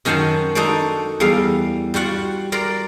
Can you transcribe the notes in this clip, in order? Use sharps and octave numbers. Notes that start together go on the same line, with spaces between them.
F#2 D#3 C#4 C5 F#5 A5
D4 D#4 F#4 A4 C5 D5
E2 G3 F5
G3 F4 F#4 F#5
A#4 D5 A#5 C6